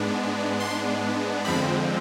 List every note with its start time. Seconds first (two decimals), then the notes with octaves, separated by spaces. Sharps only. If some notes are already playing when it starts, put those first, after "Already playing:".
Already playing: G#2 G#3 B3 D4
0.60 C6
1.45 F2 D3 F3 G#3 C4 B5